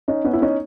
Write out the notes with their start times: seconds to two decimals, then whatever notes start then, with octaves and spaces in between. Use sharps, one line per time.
0.08 C#4 D#4
0.24 B3 C#4
0.33 E4
0.42 C#4 D#4